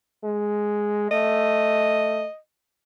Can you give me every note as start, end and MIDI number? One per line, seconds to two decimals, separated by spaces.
0.24 1.09 56
1.11 2.26 57
1.11 2.37 75